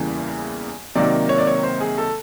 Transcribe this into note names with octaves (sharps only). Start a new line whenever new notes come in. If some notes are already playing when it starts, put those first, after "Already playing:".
Already playing: E2 C#3 E3 G3 A#3
C3 D#3 F#3 A#3 D5
C#5
D5
C#5
C5
G#4
A4